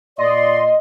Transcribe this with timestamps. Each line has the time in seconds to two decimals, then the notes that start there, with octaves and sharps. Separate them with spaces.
0.18 A#2 D5 D#5 C6